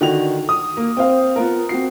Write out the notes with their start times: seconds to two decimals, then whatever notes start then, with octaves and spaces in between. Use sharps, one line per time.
0.01 D3 D#3 F#4 F7
0.49 D#6
0.77 A#3
0.97 C4 C5 F5
1.36 B3 F4 A#4
1.69 C4 F#4 C7